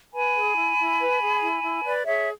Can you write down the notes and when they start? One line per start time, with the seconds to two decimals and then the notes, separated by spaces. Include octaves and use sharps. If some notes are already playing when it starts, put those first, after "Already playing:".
0.13 B4 G#5 B5
0.34 G#4
0.56 E4
0.78 E4
0.99 B4
1.20 G#4
1.41 E4
1.63 E4
1.84 B4 D5
2.06 G#4 C#5 E5